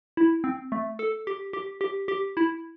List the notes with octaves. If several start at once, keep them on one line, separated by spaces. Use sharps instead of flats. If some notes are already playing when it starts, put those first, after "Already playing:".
E4
C4
A3
A4
G4
G4
G4
G4
E4